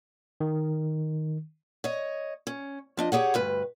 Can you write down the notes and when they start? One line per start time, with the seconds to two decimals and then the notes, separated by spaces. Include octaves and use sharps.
0.41 D#3
1.84 C#5 D#5
2.47 C#4
2.97 F3 D4 D#5
3.12 G4 G#4 C#5 F#5
3.34 D2 G2 B4